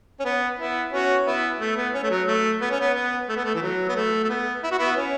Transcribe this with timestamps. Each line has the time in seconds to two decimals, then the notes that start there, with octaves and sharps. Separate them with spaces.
0.20 C#4
0.25 B3
0.59 B3 E4
0.92 C#4 F#4
1.26 B3 E4
1.60 A3
1.77 B3
1.94 C#4
2.03 A3
2.11 F#3
2.27 A3
2.61 B3
2.71 C#4
2.80 B3
2.95 B3
3.29 A3
3.37 B3
3.44 A3
3.55 E3
3.62 F#3
3.89 B3
3.96 A3
4.24 A3
4.29 B3
4.64 E4
4.72 F#4
4.79 B3 E4
4.96 C#4